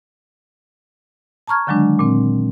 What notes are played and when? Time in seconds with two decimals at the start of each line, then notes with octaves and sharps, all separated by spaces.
1.47 A5 A#5 C#6 F6 G#6
1.67 D3 D#3 F#3 G#3 D4
1.99 A#2 C4